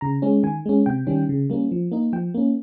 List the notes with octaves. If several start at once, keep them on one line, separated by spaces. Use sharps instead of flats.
C#3 A#5
G#3 C#4
D#3 G#5
G#3 C#4
C3 G5
D#3 G3 C#4
C#3
G3 A#3 C#4
F3
A#3 D#4
F3 G5
A#3 C#4